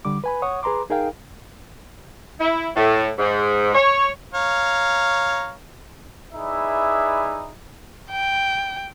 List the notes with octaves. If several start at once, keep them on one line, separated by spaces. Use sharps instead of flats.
D3 G3 D6
B4 G#5 B5
C#5 F#5 C#6 D#6
G#4 B4 A#5 C6 D6
D#4 G#4 A#4 F5 G5
E4
A2
G#2
C#5
C#5 F5 A#5
D#4 E4 G#4 B4 D5 E5
G5